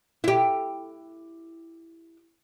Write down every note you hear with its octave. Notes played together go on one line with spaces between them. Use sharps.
E4 G4